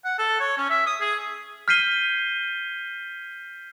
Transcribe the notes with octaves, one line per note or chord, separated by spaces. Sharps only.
F#5
A4
C#5
C#4
E5
D#6
G#4
F6 G6 B6 C7 D#7 G7